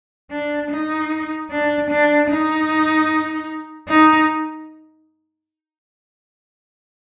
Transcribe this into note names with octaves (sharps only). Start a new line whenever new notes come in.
D4
D#4
D4
D4
D#4
D#4